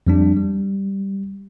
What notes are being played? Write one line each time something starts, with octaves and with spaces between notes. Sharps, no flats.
F2 G3 D4
G3